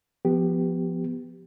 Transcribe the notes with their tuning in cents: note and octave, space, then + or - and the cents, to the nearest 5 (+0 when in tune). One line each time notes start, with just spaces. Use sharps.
F3 +0 B3 +0 G4 +0